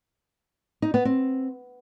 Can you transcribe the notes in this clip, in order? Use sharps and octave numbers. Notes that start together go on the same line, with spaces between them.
D#4
B3
C4